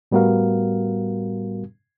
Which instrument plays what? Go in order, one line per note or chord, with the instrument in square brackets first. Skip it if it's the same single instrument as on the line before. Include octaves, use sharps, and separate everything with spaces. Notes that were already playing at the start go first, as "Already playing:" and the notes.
[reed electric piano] A2 G3 B3 F#4 A#4 F5